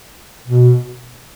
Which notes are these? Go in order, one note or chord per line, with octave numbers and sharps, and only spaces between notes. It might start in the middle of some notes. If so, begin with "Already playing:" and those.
B2